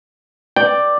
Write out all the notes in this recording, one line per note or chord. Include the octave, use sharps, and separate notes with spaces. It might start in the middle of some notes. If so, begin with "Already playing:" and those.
D5 G5